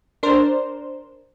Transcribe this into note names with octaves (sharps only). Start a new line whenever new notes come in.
D4 A#4 C5